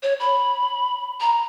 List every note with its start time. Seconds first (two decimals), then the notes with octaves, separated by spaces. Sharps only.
0.03 C#5
0.20 B5
1.20 A#5